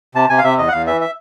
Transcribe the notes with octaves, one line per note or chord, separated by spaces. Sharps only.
C3 A5
C3 G#5
F5
C3 E5
E2 D#5
F#5
E2 F5
E3 E5
E5